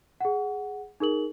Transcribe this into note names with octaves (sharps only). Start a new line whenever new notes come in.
G#4 F#5
D#4 G#4 A#4 F#7